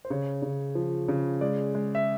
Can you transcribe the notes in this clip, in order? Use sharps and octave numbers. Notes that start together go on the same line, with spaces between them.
C5
C#3 C#5
C#3
F3
C#3
G#3 D5
G#3
E5